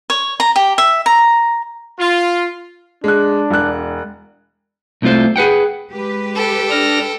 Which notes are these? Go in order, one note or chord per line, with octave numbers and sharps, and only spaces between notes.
C#5
A#5
G4
E5
A#5
F4
G#3 D4 F#6
E1 F#6
C2 C3 A3 F4 C5
G#4 B4 F#5 G5
G#3 G4 B4
A4 G5
D4 F6 A#6